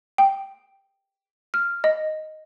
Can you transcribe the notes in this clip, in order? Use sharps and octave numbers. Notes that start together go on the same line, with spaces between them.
G5
F6
D#5